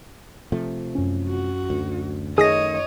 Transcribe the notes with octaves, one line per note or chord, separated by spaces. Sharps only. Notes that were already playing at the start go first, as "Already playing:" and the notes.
C3 F3 A3
F#2 C#4
F#4
D2
D#3 A3 G#4 C#5 D#5 D#6 A#6